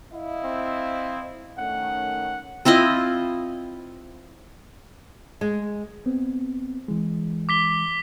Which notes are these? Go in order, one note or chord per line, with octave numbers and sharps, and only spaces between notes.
E4 D#5 F5
C4
D#3 A3 C#4 F#5
C4 E4 F4 D#5
G#3
B3 C4
E3 G#3
D6 B6 G7